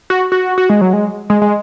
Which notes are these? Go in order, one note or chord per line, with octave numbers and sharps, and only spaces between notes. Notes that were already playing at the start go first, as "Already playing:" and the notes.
F#4
F#4
F#4
G#3
F#3
G#3
G#3
G#3